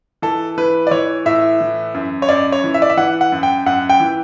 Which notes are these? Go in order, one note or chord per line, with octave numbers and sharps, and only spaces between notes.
E3 A4
E3 B4
D5
E3 C#5
A2 E5
E3
F#2
C#5
F#2 D5
C#5
E3
E5
D5
E5
E3 F#5
F#5
F#2
G5
F#2 F#5
G5
E3